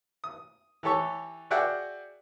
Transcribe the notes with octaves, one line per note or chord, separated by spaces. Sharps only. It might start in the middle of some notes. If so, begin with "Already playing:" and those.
D#6
E3 G4 A4 C#5 C#6
F#4 G#4 D5 E5 F#5 G5